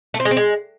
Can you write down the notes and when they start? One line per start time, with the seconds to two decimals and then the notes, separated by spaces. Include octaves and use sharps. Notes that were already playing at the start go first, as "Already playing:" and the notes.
0.14 A3
0.20 C4
0.25 G#3
0.31 C4
0.37 G#3